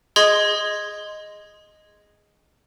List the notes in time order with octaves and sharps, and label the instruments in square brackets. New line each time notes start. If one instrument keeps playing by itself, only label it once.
[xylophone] G#4 D#5 C6 G#6 A#6